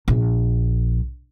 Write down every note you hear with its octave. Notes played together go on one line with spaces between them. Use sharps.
A#1